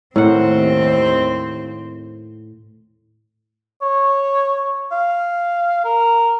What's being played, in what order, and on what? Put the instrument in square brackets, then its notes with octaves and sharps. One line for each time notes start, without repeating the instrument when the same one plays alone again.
[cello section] D#2 C4 [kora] A2 A#4 F#5
[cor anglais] C#5
F5
A#4